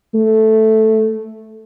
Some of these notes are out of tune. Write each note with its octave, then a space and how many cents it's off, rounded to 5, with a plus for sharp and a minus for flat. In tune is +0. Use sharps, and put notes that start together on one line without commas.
A3 -5